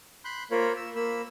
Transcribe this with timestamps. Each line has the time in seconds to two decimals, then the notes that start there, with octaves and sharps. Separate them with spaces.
0.25 B5 C6 F#6 G6
0.51 A#3 F4 A#4 C5 C#5 B5
0.77 E6
0.95 A#3 B5 E6